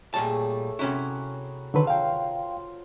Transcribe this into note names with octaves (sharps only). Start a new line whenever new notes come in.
A#2 G3 A3 G#4 C#5 A5
C3 C#4 E4 F#4 A#5 B5
D3 D#3 F#3 A4 B4 C5
F4 A#4 F5 G5